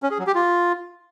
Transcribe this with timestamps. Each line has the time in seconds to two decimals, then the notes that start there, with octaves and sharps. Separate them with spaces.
0.03 C#4
0.11 G#4
0.19 F#3
0.27 G4
0.35 F4